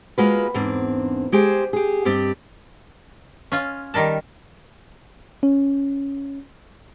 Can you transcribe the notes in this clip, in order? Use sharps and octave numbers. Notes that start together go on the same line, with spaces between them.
G#3 A#3 F4 F#4 B4
E2 G#2 A#3 C4 D4
G#3 G4 G#4 C5
G4 G#4
G2 C4 G4 D5 D#5
C#4 F4
D#3 G3 A#4 A5
C#4